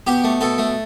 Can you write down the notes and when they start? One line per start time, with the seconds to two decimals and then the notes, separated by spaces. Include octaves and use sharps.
0.07 B2 G4
0.24 A3
0.41 B2 A4
0.58 A3